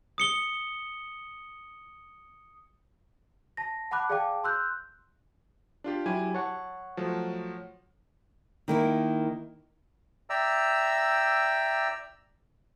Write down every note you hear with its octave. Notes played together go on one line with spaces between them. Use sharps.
D#6 C#7 G7
A5 A#6
F#5 A5 B5 D6 F#6
G#4 D5 F5 G5 A5 D6
C6 E6 F#6 G6
D4 F4 G4
F#3 E4 G4 G#5
C#5 F#5 A5
F3 F#3 A3
D#3 A#3 E4
D5 E5 G5 A#5 E6